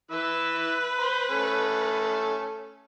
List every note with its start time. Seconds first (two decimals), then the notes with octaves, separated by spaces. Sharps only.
0.11 E3 E4 B4 E6
0.98 C5 B5
1.30 A3 C#4